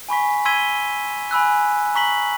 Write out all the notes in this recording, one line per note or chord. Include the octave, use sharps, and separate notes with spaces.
G#5 B5 C#6 B6
C6 E6 G#6 B6 D#7 G7
G#5 B5 E6 F#6
A#5 C#6 B6 F#7